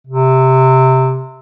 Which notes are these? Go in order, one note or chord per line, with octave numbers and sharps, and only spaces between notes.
C3